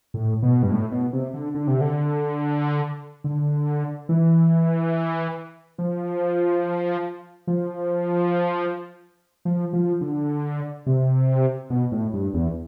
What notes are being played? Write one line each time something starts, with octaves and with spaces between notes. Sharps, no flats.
A2
B2
G2
A2
B2
C3
D3
D3
C3
D3
D3
E3
F3
F3
F3
F3
D3
C3
B2
A2
G2
E2